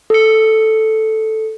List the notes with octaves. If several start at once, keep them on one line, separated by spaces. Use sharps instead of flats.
A4 C#7